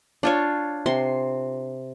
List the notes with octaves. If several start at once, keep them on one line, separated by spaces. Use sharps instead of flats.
D4 F4 C#5
C3 C6